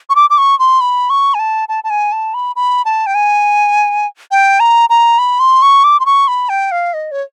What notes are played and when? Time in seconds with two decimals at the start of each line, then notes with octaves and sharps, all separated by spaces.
0.10 C#6
0.16 D6
0.30 D6
0.38 C#6
0.59 C6
0.81 B5
1.10 C#6
1.34 G#5
1.39 A5
1.69 A5
1.84 A5
1.90 G#5
2.12 A5
2.34 B5
2.56 B5
2.85 A5
3.07 G5
3.15 G#5
4.31 G5
4.60 A#5
4.90 A#5
5.19 B5
5.40 C6
5.62 C#6
5.84 D6
6.00 C6
6.06 C#6
6.28 B5
6.49 G5
6.72 F5
6.94 D#5
7.12 C#5